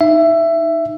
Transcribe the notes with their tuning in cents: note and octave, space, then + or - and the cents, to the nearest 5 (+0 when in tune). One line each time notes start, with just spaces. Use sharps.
D#4 +0 E5 +15